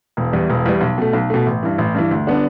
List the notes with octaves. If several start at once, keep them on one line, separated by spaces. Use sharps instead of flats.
E1
E2 E3 G3
E1
E2 E3 G3
B1
B2 A3
B1
B2 A3
A1
G2 E3
A1
G2 E3
D2
D3 G3 B3 D4